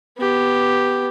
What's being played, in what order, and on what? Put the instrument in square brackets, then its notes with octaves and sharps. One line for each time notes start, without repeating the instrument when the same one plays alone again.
[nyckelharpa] B3 G4